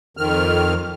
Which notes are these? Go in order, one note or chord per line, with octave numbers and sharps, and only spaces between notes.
F2 D#3 F6